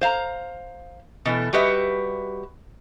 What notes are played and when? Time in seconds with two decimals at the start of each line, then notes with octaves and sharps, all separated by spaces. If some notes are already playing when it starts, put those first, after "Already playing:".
0.01 C5 F5 A#5
1.25 B2 E3 A3
1.53 G3 F#4 G4 B4 D#5 E5